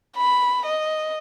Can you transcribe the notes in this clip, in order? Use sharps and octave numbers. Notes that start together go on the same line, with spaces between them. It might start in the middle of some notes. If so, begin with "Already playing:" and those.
B5
D#5